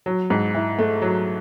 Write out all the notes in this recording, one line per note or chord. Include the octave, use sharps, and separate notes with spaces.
F#3
G#2
E4
A3
F#3